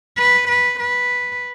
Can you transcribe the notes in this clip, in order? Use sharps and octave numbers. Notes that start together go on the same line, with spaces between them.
B4
B4
B4